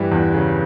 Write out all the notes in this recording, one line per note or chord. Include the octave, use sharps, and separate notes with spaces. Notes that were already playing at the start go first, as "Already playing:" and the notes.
Already playing: G2 E3 G3
E2
C#3